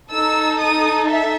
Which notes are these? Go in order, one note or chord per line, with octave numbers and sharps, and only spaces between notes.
D#4 A4 E6
D#6
E5